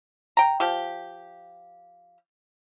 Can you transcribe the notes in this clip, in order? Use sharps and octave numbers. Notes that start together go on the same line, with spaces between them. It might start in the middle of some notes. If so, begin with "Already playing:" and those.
G5 A#5
F3 G4